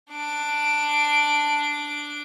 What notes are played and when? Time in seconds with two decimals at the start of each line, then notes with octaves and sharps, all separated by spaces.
0.12 D4 D7